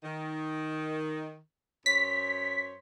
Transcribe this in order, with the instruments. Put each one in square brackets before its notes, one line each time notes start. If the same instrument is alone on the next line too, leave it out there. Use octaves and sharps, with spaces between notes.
[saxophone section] D#3
[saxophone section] F#2 C5 C#5 [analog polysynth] B6